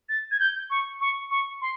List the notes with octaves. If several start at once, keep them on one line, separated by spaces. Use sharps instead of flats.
A6
G#6
G6
C#6
C#6
C#6
C6